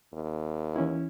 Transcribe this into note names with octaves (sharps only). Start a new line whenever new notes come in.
D#2
E3 C#4 E4